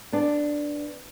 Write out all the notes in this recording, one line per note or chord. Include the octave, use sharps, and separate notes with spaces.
B3 D4